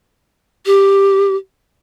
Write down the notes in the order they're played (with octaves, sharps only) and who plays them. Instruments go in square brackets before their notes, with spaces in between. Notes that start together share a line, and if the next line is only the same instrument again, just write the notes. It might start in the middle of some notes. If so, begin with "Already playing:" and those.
[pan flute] G4